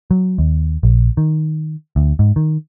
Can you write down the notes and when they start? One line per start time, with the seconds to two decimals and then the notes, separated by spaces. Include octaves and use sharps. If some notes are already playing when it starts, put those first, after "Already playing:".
0.11 F#3
0.38 D#2
0.83 A#1
1.17 D#3
1.96 D2
2.19 G#2
2.36 D#3